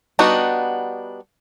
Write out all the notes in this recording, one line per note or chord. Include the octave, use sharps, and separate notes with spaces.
G3 B3 D4 D#4 F#4